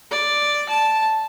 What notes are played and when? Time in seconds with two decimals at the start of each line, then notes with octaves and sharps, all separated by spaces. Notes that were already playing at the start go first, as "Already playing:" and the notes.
0.11 D5
0.70 A5